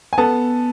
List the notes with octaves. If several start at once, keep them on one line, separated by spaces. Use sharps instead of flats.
G#5
B3 A4 A5